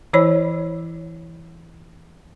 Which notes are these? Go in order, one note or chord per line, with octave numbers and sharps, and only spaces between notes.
E3 E4 C5 C#5 B5 E6